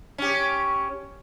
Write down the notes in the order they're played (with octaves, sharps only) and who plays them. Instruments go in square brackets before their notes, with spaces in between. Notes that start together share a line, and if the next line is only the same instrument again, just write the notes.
[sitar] C#4 G4